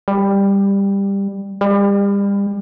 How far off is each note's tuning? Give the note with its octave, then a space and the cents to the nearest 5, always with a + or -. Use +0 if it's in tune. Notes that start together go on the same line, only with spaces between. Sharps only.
G3 +15
G3 +35